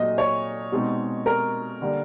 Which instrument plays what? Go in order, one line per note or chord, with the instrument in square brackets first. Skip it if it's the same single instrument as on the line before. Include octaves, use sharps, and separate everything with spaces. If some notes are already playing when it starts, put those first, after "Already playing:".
Already playing: [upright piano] A#2 F#3 A3 D#5
C#5
B2 G#3 C4 D#4
A#4
D3 G3 A#3